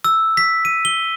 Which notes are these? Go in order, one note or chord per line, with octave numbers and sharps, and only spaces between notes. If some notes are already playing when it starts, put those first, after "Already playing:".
E6
B6
D#7
G7